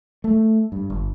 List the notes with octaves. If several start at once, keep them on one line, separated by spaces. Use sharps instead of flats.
A3
G2
G1